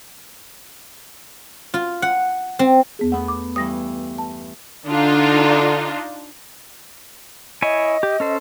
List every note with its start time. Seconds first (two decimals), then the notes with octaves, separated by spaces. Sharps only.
1.74 F4
2.02 F#5
2.59 C4
2.99 E2 B3 G#4
3.12 A3 B3 F#5
3.28 D6
3.56 G2 E3 D#6 A#6
4.18 A5
4.86 D3 D4 D#4 F4
7.62 E4 C#5 D#5 G#5
8.03 G4
8.20 C#4 A4 C5